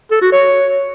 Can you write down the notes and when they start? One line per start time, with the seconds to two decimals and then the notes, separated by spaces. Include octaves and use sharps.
0.11 A4
0.22 F#4
0.32 C#5